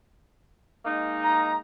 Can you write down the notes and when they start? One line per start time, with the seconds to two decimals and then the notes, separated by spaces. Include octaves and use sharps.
0.85 G#3 A#3 D#4
1.24 A#5